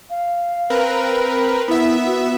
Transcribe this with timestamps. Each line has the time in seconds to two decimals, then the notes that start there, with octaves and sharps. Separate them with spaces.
0.10 F5
0.70 C4 A#4 B4
1.68 B3 E4 E5
2.06 F#4